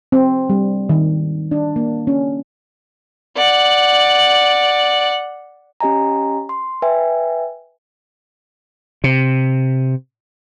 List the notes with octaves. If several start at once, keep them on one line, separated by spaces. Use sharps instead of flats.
C4
G3
D#3
D4
A#3
C#4
D5 F#5
C#4 G4 D#5 G#5 A#5
C6
B4 E5 G5 G#5
C3